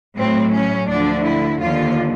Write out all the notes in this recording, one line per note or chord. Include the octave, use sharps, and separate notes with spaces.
A2 F#3 C4
C#4
D2 D3 F3 D4
E4
D#2 D3 F3 F4